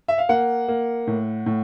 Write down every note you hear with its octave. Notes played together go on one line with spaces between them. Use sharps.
E5
F5
A#3 F#5
A#3
A2
A2